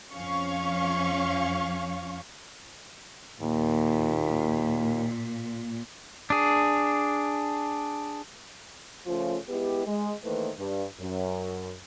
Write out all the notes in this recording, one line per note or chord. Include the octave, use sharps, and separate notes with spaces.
F2 F3 C#4 F5 C#6
D#2 A#2
D4 G#4
C#3 F3 A3 C#4 F4
G#3 B3 E4 G4
G#3
D#3 E3 A3 A#3 B4 C5
G2
F#2